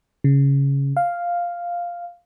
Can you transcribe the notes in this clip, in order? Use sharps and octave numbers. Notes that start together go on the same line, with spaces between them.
C#3
F5